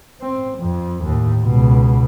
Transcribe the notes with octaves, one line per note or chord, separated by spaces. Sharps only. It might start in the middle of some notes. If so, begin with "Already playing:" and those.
C4
F2
D#2 A2
C#2 B2